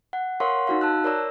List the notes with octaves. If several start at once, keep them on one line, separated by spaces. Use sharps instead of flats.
F#5
A#4 C#5 F5 F#5 C6 C#6
D#4 F#4 F5
A5 E6 F#6
A#4 C#5 D5 A#5 E6